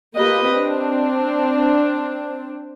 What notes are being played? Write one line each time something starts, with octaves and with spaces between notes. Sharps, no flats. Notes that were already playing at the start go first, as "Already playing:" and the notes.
A#3 F4 G4 B4 D#5
C4 D4